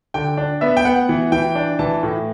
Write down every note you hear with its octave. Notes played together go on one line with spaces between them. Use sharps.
D3 G5
D4
B3 E5
G5
B3 F#5
E3
E3 G5
D4
E3 A5
A2